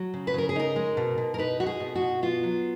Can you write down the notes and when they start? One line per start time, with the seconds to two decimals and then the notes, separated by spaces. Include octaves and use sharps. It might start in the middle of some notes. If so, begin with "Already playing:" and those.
Already playing: F#3
0.14 C#3
0.27 B4
0.34 C#3 A#4
0.49 G#4
0.56 D#4 A#4
0.76 G#3
0.97 B2
1.18 B2
1.34 A#4
1.38 D#4 B4
1.60 G#3 F#4
1.66 G#4
1.80 B2
1.95 F#4
2.02 B2
2.22 B3 F4
2.43 F#3